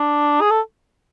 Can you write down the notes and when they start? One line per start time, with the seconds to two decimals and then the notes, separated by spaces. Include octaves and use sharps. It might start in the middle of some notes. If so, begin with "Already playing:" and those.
Already playing: D4
0.41 G#4
0.51 A4